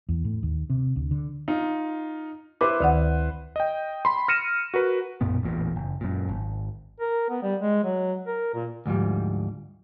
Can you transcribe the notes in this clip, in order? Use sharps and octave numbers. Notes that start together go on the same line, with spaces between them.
E2
A2
D#2
C3
D2
D3
D#4 F4
E4 B4 C5 D6
D2 D#3 F#5
D#5 G5
B5 C6
F6 A#6 C#7 D#7 E7
F#4 A#4 B4
B1 F#2 A#2 B3
A1 E2 A#2
F#1
F#2 A#2
G#1
A#4
B3
G3
G#3
F#3
A#4
A#2
D2 G#2 F3 G3